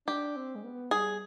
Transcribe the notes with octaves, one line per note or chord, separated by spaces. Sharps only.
D4 G4
C4
G#3
B3
G3 G#4